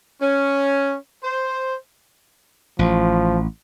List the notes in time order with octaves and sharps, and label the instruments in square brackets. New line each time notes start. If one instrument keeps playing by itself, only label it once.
[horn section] C#4
C5
[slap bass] A1 [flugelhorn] F3